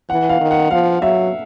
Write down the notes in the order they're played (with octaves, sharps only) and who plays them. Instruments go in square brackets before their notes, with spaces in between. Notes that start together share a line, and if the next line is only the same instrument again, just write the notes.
[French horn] E3 [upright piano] F#5
[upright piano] F5
[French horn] D#3
[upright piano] F#5
[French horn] F3 [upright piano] F5
[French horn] F#3 [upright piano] E5